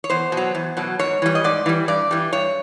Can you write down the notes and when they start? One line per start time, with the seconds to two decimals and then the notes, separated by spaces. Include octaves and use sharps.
0.04 C#5
0.10 E2 C5
0.32 B2
0.37 F#3
0.55 E2
0.77 B2 F#3
0.99 G#2 C#5
1.22 E3 G3
1.35 D#5
1.44 G#2 D5
1.66 E3 G3
1.88 G2 D5
2.11 E3 G3
2.33 G2 C#5